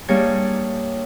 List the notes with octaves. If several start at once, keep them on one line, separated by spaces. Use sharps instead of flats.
G3 A#3 D4 G#4 C#5